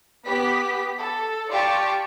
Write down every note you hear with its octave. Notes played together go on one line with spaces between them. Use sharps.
B3 G4 B4 B6
A4
F4 G4 D5 G5 A5 C#6